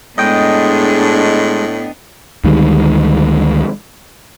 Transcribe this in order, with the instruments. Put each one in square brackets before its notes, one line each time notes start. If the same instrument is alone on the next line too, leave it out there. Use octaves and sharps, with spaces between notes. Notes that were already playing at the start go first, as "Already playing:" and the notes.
[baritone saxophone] A2 [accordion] G#3 [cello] B3 D4 [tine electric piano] D#5 G5 D#6
[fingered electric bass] D2 D#3 G3 G#3